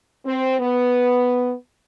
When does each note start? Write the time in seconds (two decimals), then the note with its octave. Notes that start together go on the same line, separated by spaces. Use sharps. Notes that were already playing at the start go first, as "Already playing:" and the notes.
0.26 C4
0.60 B3